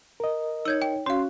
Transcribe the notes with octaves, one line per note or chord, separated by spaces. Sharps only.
A#4 D#5
D#4 C#5 E6 G6 G#6
G5
C#4 F#4 C#5 F5 C6